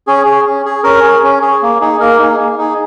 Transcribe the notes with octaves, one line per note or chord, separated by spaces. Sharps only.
C#4 G#4
G#4
C#4
G#4
C#4 A#4
G#4
C#4
G#4
A#3
D#4 G#4
A#3 A#4
D#4 G#4
A#3
D#4 G#4